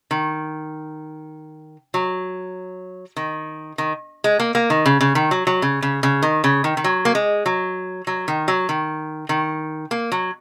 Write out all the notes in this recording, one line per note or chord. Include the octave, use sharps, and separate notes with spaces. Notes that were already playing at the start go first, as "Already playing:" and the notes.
D#3
F#3
D#3
D#3
G#3
A#3
A#3
D#3
C#3
C#3
D#3
F#3
F#3
C#3
C#3
C#3
D#3
C#3
D#3
D#3
F#3
A#3
G#3
F#3
F#3
D#3
F#3
D#3
D#3
A#3
F#3